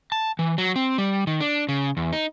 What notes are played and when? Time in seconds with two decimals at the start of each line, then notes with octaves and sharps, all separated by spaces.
0.12 A5
0.39 E3
0.58 F#3
0.76 C4
0.98 G3
1.27 D#3
1.40 D4
1.69 C#3
1.97 E2
2.13 D#4